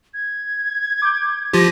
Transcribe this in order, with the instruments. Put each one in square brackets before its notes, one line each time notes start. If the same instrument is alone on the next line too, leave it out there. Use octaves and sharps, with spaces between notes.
[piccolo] G#6
[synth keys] D6 G6
[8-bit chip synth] F3 F4 G4 [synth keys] A6 A#6 D#7